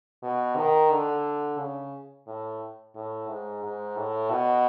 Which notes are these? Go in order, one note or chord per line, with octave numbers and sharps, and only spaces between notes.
B2
D#3
D3
C#3
A2
A2
G#2
G#2
A2
B2